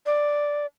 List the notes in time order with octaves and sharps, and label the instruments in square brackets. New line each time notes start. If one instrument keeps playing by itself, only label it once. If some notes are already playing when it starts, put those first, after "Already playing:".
[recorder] D5